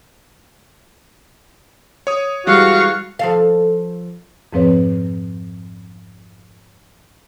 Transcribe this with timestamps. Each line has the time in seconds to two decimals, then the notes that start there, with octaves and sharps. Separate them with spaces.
2.07 C#5 D#6
2.47 E3 G3 G#3 F#4 F5 C#6
3.19 F3 A4 F5
4.53 F2 G#2 F3 C4 B4 C#5